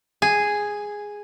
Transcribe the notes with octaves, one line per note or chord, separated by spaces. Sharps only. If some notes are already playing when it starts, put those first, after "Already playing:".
G#4